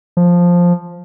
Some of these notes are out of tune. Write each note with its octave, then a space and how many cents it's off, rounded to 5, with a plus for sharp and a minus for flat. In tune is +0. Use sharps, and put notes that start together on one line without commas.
F3 +5